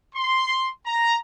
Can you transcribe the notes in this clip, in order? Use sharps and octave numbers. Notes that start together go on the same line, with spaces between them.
C6
A#5